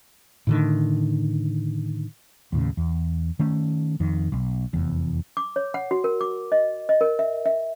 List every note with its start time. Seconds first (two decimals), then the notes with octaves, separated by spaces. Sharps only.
0.47 A2 D3 D#3
2.52 D#2 A2 C#3
2.77 E2
3.39 D#3 A3 C#4
4.00 F2 D#3
4.32 B1
4.73 F1 E2
5.37 D6
5.56 C#5
5.74 F#5
5.91 F#4
6.04 A#4
6.21 D6
6.52 D#5
6.89 D#5
7.01 A#4
7.19 E5
7.46 E5